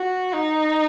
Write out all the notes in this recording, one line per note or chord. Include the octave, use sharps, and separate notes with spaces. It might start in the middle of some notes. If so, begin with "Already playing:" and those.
Already playing: F#4
D#4